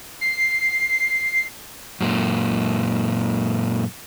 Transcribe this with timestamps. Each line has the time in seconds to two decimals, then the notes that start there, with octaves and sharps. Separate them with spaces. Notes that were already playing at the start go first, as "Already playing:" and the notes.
0.21 C7
2.01 F#2 A#2